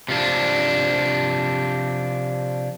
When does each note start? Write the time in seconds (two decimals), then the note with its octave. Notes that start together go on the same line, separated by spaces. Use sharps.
0.08 C3 F3 D4